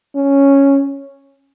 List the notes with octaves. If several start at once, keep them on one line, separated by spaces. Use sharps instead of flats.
C#4